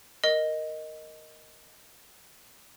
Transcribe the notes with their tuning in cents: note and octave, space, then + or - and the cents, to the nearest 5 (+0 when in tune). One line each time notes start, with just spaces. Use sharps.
A#4 +0 D#5 +0